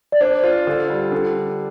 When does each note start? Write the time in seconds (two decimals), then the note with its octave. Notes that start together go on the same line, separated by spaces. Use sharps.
0.12 D5
0.21 D4 C5
0.44 F4
0.67 D3
0.90 G3
1.12 D3